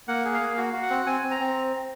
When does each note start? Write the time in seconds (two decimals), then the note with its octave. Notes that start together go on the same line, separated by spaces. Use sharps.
0.08 A#3 F#5
0.25 G#4
0.34 F5
0.41 A#3
0.58 F#4
0.73 F#4
0.82 F#5
0.90 C4
1.06 C4 G#5
1.24 C4
1.31 A#5
1.40 C4